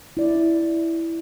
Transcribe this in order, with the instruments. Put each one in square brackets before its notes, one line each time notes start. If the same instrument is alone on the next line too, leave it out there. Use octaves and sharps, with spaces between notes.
[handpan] E4 D5